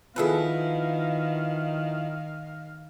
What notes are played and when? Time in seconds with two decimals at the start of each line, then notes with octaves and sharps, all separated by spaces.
0.16 D#3 F3 B3 E4 G#4 A4 B4 F5